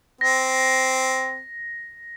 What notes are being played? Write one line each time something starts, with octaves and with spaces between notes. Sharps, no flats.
C4 A#6